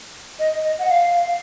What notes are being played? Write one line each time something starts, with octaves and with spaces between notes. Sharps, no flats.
D#5
D#5
F#5
F5